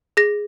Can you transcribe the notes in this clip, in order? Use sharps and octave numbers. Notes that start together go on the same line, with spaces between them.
G#4 A#6